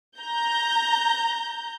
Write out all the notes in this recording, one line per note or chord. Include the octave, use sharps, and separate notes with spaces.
A#5 G6